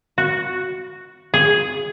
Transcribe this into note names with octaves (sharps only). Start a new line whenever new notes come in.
F#4
G#4